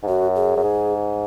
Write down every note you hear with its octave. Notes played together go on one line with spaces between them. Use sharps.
G#2
F#2 F#4
G#4
F#2
G#2